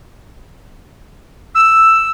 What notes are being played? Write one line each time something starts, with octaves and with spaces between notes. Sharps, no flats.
E6